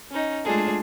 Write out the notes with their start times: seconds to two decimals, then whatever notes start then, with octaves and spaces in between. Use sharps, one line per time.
0.10 C#4 D#4
0.44 G#3 A3 D4 F4 G#4 A4